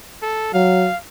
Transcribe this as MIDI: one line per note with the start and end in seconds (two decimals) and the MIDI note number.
0.22 0.52 69
0.54 0.89 54
0.54 0.97 77